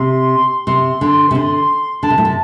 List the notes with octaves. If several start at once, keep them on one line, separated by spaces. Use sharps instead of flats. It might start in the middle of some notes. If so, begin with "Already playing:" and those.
Already playing: C3 C6
C3 C6
D3
C3
D3
D3 A5
C3
A2
C3